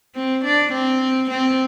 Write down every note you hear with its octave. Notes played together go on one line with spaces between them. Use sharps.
C4
D4
C4
C4